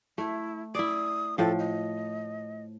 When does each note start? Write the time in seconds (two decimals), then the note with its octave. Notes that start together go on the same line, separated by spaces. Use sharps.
0.18 A3 E4
0.75 E4 D5 D#6
1.38 A2 F3 A4
1.59 D#5